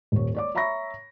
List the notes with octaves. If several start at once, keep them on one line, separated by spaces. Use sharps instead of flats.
D#1 C#5
C#5 D5 D6
C#5 E5 A#5 B5 C#6 A#6